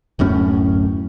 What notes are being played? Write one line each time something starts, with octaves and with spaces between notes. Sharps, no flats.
D1 F#2 A2 C#4